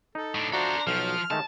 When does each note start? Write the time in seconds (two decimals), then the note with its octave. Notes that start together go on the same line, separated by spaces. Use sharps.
0.15 D#4 A4
0.35 A2 D4
0.53 F3 D4 F#4 A4 C5 E5 A#5
0.87 B1 F3 F#3 F6
1.31 D#3 G#3 A3 A5